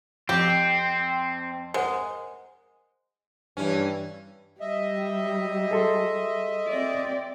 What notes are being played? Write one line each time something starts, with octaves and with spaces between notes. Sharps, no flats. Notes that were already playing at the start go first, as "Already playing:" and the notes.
F2 C4 G4
G#3 A#4 C5 F#5
G2 E3 C#4
G3 D#5 E5
G#4 A4 C6
C4 D5